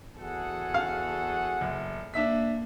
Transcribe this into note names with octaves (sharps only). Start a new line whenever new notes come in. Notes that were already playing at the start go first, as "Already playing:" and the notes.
E2 F#4 G#4 A4 F#5
F5
F#1
A#3 D4 E5 B6